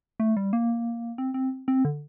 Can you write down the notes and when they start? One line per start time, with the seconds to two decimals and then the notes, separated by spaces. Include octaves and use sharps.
0.20 A3
0.37 G3
0.53 A#3
1.18 C4
1.34 C4
1.68 C4
1.85 D3